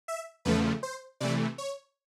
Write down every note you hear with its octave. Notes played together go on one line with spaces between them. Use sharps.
E5
E2 C#3 F3 A3 B4
C5
C3 E3 A3 D5
C#5